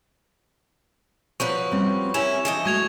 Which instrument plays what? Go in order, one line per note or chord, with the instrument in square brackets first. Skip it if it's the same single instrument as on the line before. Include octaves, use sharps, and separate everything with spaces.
[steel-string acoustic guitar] F3 F#3 B4 [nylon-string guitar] C5 D5 [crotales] C#6
[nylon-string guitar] G3 C4 C#4
[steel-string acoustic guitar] C#4 E4 A#4 [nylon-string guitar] G4 [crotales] E7
[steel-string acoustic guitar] E3 F3 D#5 [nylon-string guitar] D4
[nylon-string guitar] G#3 A3 F#4 [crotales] C#6 G#6 F7